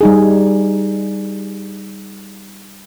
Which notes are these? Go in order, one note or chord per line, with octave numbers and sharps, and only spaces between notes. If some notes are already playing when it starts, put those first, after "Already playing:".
G3 D#4 G#4